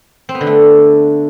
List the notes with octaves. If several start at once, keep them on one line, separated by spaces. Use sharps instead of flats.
C4
B3
D3
A3